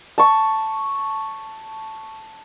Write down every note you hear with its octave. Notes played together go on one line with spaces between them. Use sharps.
A5 C#6